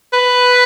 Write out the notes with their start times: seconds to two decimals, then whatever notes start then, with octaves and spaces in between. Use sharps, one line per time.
0.13 B4